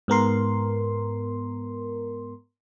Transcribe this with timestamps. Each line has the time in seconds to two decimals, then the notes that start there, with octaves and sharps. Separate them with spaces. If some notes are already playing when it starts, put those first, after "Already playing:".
0.08 G#2 B3 A#4 C6